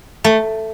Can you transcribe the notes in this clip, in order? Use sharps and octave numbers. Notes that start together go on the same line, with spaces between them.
A3